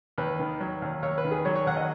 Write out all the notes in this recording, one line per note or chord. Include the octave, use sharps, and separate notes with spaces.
D#2 B4
D#3
F#3
D#2
D#2 C#5
B4
D#3
G#4
F#3 C#5
C#5
D#2 F#5
D#5